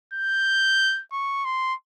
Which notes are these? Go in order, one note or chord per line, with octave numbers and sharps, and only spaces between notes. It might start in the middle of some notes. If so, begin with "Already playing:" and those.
G6
C#6
C6